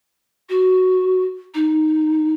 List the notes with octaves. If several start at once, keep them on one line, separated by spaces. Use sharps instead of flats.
F#4
D#4